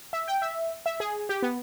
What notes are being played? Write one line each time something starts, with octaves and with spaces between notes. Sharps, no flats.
E5
G5
E5
E5
G#4
G4
B3